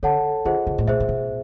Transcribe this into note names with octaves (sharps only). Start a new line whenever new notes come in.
D3 A4 C#5 F#5 A5
D3 F4 G#4 C5 D#5 F#5
C#3
A2
A#2 G#4 C5 E5
A#2
B2